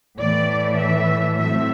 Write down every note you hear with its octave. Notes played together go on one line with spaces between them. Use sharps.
A2 E3 A3 D5
E5
A2 F#3 A3 C4 E5